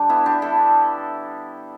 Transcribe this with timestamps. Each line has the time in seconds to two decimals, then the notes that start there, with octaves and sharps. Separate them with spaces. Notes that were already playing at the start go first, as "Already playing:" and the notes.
Already playing: D3 G3 D4 G4
0.09 B3 E4
0.26 D4 G4
0.42 E4 A4